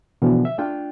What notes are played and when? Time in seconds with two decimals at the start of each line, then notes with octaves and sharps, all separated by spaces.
0.22 B2 D3 E3 F3 B3
0.45 E5
0.58 A3 D4 F4 G5